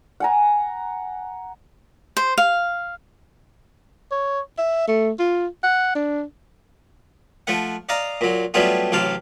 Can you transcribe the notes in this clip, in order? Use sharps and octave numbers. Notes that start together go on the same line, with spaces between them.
F#5 G#5 A#5
C5
F5
C#5
E5
A3
F4
F#5
D4
F3 A3 F#5
D5 D#5 F5 A#5
A#2 F#3
F#3 G3 A3 B3 F4 G#4
A1 C3 F#3 F5 A5